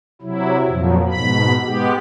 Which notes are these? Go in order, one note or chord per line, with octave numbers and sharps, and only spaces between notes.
C3 F#3 E4
F2 A#2 F3 F#3
G#2 B2 B5
G#3 B3 G4